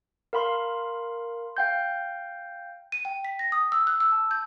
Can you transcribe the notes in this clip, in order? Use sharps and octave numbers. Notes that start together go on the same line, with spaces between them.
A#4 F5 B5 C6
F5 G5 G6
D#7
G5
B6
A#6
D#6
E6
F#6
E6
A5
G6